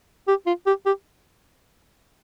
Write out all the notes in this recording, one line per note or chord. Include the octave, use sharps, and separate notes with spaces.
G4
F4
G4
G4